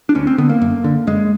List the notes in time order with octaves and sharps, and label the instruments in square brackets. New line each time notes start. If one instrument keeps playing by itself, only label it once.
[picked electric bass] D4
D2 C#4
C4
D3 B3
A#3
F#2
D3
F#2 G#3